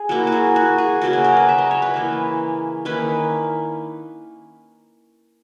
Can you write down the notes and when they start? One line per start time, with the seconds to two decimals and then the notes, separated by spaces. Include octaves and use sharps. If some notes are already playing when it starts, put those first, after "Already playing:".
Already playing: G#4
0.09 F#3 A#3 E4 F#4
0.27 F#4
0.32 G#4
0.56 F#4
0.78 G#4
1.02 C#3 F#3 A#3 F#4
1.13 G#4
1.24 A#4
1.37 B4
1.49 E5
1.58 D#5
1.71 C#5
1.82 B4
1.94 E3 A#3 E4
2.85 D#3 A#3 C#4 E4 B4